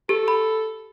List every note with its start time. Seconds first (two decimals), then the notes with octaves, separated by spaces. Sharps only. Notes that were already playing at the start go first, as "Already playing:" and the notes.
0.09 G4 A4
0.28 B5